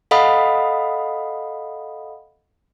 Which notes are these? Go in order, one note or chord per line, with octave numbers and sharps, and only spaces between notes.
A4 D#5 F5 F#5 B5 D#6